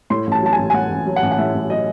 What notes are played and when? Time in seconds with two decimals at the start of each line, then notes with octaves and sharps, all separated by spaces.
0.10 A2 C6
0.27 A1 A5
0.42 F#3 A5
0.53 G#5
0.58 A1
0.70 G#5
0.74 A2 F#5
0.90 A1
1.06 F#3
1.16 F#5
1.22 A1
1.32 F#5
1.38 A2 E5
1.54 A1
1.70 F#3 D#5